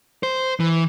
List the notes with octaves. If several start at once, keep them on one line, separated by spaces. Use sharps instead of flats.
C5
E3